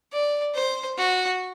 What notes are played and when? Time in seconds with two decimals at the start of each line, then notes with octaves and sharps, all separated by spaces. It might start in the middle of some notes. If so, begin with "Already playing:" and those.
0.13 D5
0.55 C5
0.98 F#4